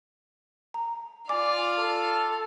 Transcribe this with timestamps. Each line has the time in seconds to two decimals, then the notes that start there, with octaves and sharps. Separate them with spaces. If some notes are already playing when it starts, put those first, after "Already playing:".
0.74 A#5
1.29 F4 D5 F5 G#5 D6
1.78 A4